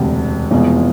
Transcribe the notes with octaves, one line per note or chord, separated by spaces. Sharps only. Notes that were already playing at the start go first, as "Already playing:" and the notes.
Already playing: E1 D2 C3
F1 E2 B2 G#3